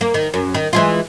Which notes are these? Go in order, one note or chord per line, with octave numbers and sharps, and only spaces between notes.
A#3
D#3
F#2
D#3
E3 G#3 F4